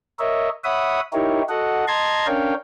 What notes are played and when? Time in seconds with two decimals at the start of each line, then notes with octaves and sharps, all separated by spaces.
0.19 A#4 C#5 D#5 E5
0.64 C#5 E5 F#5 B5 D#6
1.13 D#4 E4 G4 A#4 C#5
1.49 F#4 A4 D#5 F#5
1.88 D#5 A5 A#5 C6 G#6
2.26 C#4 D4 A#4 C#5 F5 G5